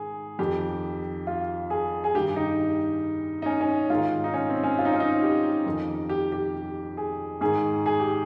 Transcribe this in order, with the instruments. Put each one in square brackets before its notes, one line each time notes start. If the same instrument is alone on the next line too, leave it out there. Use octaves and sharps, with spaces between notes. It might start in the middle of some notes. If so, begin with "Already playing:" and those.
Already playing: [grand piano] G#2 D#3 G#4
F2 D#3 G4
F4
G#4
G#4
G2 D#3 G4
D#4
D#4
C#4
C#4
G#2 D#3 F4
D#4
C#4
C4
C#4
F4
D#4
C#4
D#4
G4
F2 D#3
G4
G4
G#4
G#2 D#3 G#4
G#4
G4